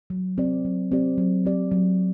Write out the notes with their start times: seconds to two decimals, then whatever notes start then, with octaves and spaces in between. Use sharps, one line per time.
0.10 F#3
0.38 C4 G4 D5
0.65 F#3
0.92 C4 G4 D5
1.18 F#3
1.45 C4 G4 D5
1.71 F#3